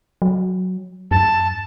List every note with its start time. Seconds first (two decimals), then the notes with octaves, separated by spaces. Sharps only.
0.22 F#3
1.11 F#2 A5